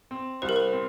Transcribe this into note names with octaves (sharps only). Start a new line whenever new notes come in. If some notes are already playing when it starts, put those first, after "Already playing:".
C4
C2 C5
A#4
C5
C4